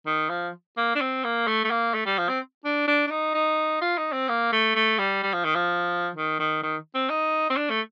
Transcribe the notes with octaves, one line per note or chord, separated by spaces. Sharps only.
D#3
F3
A#3
D4
C4
A#3
A3
A3
A#3
A3
G3
F3
C4
D4
D4
D4
D#4
D#4
F4
D#4
C4
A#3
A3
A3
G3
G3
F3
D#3
F3
D#3
D#3
D#3
C4
D#4
C4
D4
A3